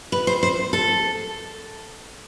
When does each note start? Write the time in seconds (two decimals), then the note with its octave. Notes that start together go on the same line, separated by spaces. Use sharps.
0.12 B4
0.27 C5
0.43 C5
0.73 A4